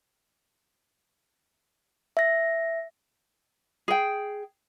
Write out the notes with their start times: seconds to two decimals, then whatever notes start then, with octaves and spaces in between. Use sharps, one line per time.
2.17 E5 A#6
3.88 G#4 G5